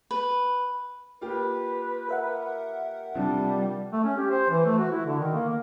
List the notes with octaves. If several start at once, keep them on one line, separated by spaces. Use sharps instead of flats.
B4
A#3 F4 G4 B4
A#4 E5 F#5
C3 F3 G3 D4
A3
C#4
G4
C5
E3
A3
F#4
E4
D3
D#3
A#3
A#3